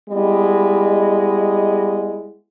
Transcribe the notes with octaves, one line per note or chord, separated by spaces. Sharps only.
G3 G#3 B3 E4 D#5